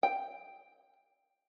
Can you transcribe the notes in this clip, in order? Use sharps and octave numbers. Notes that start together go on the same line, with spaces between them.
G5